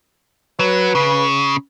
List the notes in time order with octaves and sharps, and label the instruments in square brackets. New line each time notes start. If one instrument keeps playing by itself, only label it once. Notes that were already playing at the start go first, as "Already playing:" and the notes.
[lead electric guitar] F#3 [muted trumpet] B4
[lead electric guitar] C#3